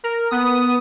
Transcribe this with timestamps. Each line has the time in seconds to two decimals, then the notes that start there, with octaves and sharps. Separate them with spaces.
0.04 A#4
0.31 B3 D#6